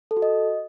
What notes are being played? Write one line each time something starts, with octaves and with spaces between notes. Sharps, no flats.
A4
F#4
D#5